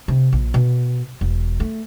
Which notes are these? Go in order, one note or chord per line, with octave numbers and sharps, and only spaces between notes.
C3
A#1
B2
E1
A3